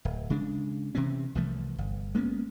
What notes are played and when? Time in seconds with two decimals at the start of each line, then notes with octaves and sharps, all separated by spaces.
0.05 D1
0.30 C#3 G#3 D4
0.95 C3 E3 C4 C#4
1.35 C2 E3 F3 A3
1.78 G1
2.15 G#3 A#3 B3 C#4